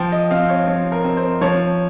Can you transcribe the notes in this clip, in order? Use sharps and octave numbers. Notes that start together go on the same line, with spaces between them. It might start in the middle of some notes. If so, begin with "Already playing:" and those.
Already playing: F3 G5
D#5
C4 F5
C#5
F3 C#5
A#4
C4
C5
F3 C#5